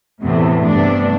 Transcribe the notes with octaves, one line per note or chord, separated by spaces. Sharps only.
E2 A2 C3 A3 B3
G2 C3 A3 B3 D4 D5